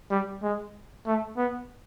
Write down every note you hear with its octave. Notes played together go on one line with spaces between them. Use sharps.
G3
G#3
A3
B3